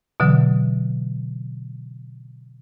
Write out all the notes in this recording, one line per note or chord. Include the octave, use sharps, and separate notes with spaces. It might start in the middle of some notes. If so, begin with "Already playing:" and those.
B2 D3 E3 F#3